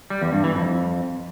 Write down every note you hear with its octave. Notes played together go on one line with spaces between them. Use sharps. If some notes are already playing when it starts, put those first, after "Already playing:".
G3
E2
G2
E3
F2